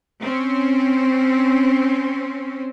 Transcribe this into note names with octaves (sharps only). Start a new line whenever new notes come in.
C4 C#4